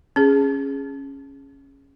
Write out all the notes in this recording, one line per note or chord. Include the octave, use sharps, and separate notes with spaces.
C#4 G#4